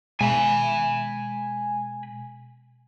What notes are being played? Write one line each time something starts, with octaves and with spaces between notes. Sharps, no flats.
B2 G#3 G#5 B5